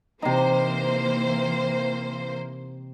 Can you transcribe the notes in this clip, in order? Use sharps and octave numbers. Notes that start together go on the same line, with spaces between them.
C3 E3 A#3 D#4 C5